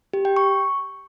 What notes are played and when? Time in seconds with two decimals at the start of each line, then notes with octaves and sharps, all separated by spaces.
0.13 G4
0.25 G5
0.36 C#6